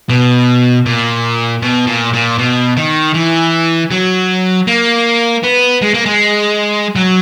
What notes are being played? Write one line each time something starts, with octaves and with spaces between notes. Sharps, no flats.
B2
A#2
B2
A#2
A#2
B2
D#3
E3
F#3
A#3
B3
G#3
A#3
G#3
F#3